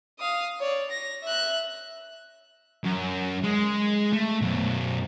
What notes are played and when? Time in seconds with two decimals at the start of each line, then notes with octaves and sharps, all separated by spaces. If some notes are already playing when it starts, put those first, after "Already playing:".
0.19 F5 D#6
0.59 C#5 D5
0.90 A#6
1.23 E5 F#6
2.84 F#2
3.44 G#3
4.13 A3
4.42 F#2 B2